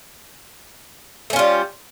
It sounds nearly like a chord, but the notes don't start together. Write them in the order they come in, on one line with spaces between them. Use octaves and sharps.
A3 C#4 F4 G3